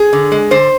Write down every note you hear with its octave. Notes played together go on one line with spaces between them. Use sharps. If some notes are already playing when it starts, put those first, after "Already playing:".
Already playing: G#4
D3
G#3
D3 C5